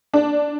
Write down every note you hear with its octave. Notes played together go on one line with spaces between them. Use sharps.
D4